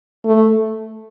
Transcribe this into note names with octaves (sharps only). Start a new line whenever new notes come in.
A3